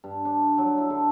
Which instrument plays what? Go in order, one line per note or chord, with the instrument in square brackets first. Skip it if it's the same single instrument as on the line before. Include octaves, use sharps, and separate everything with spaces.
[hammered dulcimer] G2
D4
F#3
E4
D3